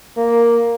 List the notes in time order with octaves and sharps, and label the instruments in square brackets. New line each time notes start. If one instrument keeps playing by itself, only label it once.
[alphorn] A#3